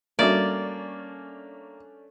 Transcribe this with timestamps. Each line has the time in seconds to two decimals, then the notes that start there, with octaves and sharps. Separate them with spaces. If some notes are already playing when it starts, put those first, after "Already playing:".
0.19 G3 A3 A#3 C#4 D4 F#4 D5 E5